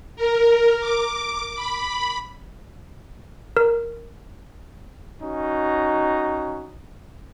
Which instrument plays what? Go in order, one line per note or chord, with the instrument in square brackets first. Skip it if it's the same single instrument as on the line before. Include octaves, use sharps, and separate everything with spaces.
[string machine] A#4
D6
B5
[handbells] A#4
[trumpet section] C#4 D#4 F#4